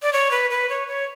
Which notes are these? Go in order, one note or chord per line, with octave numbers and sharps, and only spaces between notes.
D5
C#5
B4
B4
C#5
C#5